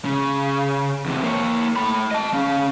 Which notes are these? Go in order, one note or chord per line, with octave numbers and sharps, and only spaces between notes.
C#3
E2 C3
A#3 C#5
A3 B5
D#5 A5
C#4 F5